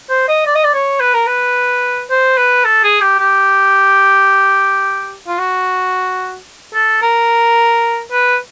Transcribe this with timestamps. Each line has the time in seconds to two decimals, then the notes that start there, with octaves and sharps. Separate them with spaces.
0.09 C5
0.28 D#5
0.46 D5
0.55 D#5
0.64 D5
0.74 C#5
1.00 B4
1.14 A#4
1.27 B4
2.10 C5
2.37 B4
2.65 A4
2.83 G#4
3.01 G4
3.19 G4
5.27 F4
5.38 F#4
6.74 A4
7.02 A#4
8.11 B4